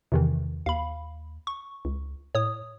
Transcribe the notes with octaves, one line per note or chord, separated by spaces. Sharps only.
E2 C3 D#3 E3
D#2 F5 B5
C#6
C#2
A2 C#5 D#6